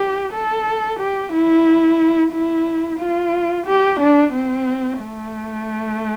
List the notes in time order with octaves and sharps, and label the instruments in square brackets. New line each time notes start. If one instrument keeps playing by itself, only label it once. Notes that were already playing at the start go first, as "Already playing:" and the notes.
Already playing: [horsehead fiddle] G4
A4
G4
E4
E4
F4
G4
D4
C4
A3